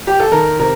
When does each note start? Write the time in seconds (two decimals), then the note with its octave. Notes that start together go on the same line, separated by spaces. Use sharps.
0.07 G4
0.20 A4
0.32 D#3 A#4
0.59 C3 A#4